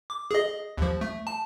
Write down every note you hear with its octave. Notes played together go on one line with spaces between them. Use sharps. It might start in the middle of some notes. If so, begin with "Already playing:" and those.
D6
G#4 D#5
D#2 F3
A3
A5